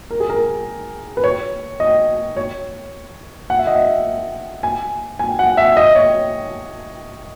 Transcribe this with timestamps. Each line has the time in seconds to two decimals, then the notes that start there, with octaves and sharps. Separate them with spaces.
0.11 A#4
0.20 G#4
0.30 A#4
1.17 B4
1.24 C#5
1.80 D#5
2.37 C#5
3.50 F#5
3.59 E5
3.67 D#5
3.76 E5
4.63 G#5
5.19 G#5
5.39 F#5
5.57 E5
5.77 D#5
5.95 C#5